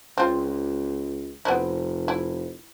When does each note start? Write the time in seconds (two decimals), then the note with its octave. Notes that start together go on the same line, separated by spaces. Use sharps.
0.18 C#2 C4 F4
1.45 F1 B3 C4 E4
2.08 E4